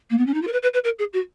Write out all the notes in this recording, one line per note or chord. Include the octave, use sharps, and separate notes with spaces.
A#3
B3
C#4
D#4
F4
A#4
B4
B4
B4
A#4
G#4
F#4